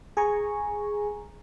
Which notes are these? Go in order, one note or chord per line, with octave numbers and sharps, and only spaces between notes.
G#4 G#5 A#5 C#6